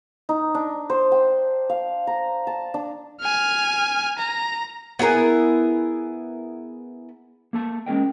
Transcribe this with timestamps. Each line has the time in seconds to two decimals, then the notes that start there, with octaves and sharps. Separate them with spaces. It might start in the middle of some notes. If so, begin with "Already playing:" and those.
0.29 D#4
0.55 D4
0.90 C5
1.12 G5
1.69 F5
2.07 A#5
2.47 A5
2.74 D4
3.21 G#5 F6
4.19 A#5
4.99 B3 E4 G#4 A#4
7.53 A#3 A4 A5
7.86 G#3 C#4 G#4 A#4 D#5 G5